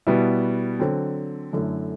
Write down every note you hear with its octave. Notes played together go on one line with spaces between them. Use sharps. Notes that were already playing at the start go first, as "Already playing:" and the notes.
B2 G3 B3 E4
D3 F#3 C4
F#2 D3 A3 E4